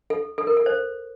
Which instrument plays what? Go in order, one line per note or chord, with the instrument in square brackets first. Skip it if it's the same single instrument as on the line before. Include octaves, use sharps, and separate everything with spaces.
[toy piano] A4
A4
A#4
A4
C5